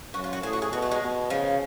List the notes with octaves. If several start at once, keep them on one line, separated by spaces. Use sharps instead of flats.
F#2 F#4
F4
F#4
A2 G#4
F#4
G#4
B2 F#4
A3
G#3
B2
C#3 F3